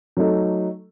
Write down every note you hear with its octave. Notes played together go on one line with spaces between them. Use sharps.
F#3 A3 D#4 A4